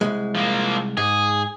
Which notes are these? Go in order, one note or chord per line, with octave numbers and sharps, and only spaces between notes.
C2 F#2 G#3
F3 A#3
G#2 G#4